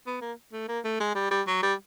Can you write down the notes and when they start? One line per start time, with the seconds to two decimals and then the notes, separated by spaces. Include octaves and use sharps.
0.07 B3
0.21 A#3
0.53 A3
0.68 A#3
0.84 A3
1.00 G#3
1.15 G3
1.31 G3
1.47 F#3
1.63 G3